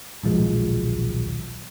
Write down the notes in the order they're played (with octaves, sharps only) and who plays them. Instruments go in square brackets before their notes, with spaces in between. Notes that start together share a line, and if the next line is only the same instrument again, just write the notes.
[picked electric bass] D#1 B1 F3 G#3